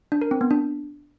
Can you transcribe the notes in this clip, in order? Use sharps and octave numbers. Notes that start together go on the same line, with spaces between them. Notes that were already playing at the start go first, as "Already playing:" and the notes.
D4
A#4
C4
B3
D4